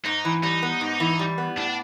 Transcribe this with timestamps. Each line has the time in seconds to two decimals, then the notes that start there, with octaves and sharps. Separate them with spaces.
0.05 G#2 D#4
0.25 E3
0.43 G3 D#4
0.62 B3
0.81 G#2
1.00 E3
1.19 G3
1.38 B3
1.57 A2 D4